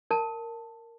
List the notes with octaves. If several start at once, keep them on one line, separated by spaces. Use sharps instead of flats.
A#4 A5